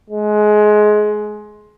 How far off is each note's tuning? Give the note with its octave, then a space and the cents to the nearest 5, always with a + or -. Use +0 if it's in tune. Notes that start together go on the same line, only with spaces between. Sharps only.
G#3 +20